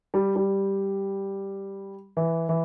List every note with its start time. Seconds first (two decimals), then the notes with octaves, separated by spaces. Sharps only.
0.14 G3
0.36 G3
2.17 E3
2.49 E3